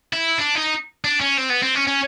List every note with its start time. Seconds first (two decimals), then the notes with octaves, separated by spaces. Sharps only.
0.13 E4
0.38 D4
0.55 D#4
1.04 D4
1.21 C#4
1.38 C4
1.50 B3
1.63 C4
1.75 C#4
1.88 C#4